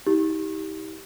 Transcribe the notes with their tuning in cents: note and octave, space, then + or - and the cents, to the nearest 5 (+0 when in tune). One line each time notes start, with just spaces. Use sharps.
D#4 +45 G4 +0